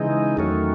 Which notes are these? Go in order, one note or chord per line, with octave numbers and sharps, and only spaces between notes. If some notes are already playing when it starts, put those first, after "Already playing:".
Already playing: C#3 E3 G#3 D#4
E2 D#3 F#3 A3 C#4